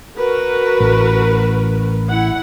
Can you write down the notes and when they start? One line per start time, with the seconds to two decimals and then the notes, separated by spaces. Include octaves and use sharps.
0.17 F#4 A#4 B4
0.80 A1
2.09 E4 F#5